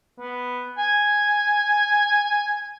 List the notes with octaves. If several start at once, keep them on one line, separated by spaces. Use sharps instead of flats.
B3
G#5